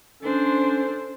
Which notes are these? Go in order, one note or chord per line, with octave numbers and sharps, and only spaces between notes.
C#4 D4 A4 C5